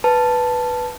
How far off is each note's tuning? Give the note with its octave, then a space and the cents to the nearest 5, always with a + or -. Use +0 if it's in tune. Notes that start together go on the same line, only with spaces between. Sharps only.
B4 +0 A5 +0